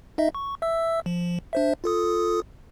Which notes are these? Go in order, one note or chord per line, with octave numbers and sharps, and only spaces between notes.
D#4 D#5 E5
C#6
E5 E6
F3
D4 C5 E5
F4 A4 D#6